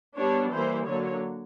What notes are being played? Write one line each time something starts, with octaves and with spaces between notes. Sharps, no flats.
G3 B3 D4 C#5
E3 G3 A#3 C5
D3 F#3 A#3 C#5